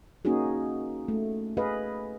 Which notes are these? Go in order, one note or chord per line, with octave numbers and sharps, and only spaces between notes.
A#3 C#4 D#4 F#4 G#4
A3
G#4 B4 D#5 F5